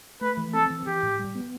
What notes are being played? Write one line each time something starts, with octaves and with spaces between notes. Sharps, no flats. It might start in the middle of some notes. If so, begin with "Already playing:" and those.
A3 B4
E3
C4 A4
E3
E3 G4
A2
G3
B3